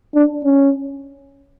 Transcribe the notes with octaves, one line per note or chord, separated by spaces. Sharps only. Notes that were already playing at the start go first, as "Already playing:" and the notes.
D4
C#4